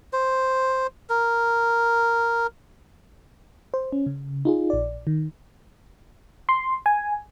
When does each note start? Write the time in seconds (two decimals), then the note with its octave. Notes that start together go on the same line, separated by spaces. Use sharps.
0.13 C5
1.09 A#4
3.74 C5
3.92 C#4
4.07 C#3
4.45 D#4 F4 G#4
4.70 A#1 D5
5.07 D#3
6.49 C6
6.86 G#5